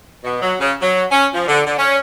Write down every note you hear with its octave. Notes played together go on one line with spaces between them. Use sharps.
B2
F#3
C#3
F#3
C#4
F3
D3
D3
C#4